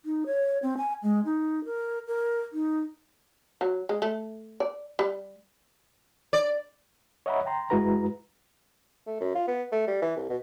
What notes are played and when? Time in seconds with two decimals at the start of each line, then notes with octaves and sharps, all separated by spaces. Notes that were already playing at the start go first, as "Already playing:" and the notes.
0.05 D#4
0.26 C#5
0.63 C4
0.78 G#5
1.03 G#3
1.25 D#4
1.65 A#4
2.07 A#4
2.53 D#4
3.61 F#3
3.89 G#3
4.02 A3
4.60 D5
4.99 G3
6.33 D5
7.26 C#5 D#5 E5 F#5 A#5 B5
7.46 G5 A#5 C6
7.70 F#2 G#3 E4 F#4 B4 A#5
9.06 A3
9.20 F#2
9.35 F4
9.48 B3
9.72 A3
9.87 G3
10.02 E3
10.16 C2
10.30 B2